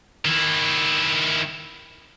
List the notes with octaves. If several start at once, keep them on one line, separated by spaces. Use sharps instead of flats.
D#3 E4